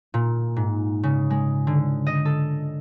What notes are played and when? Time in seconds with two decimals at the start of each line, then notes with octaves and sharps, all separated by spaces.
0.14 A#2
0.56 G#2
1.03 C#3
1.30 G#3
1.67 D3
2.07 D#5
2.25 A4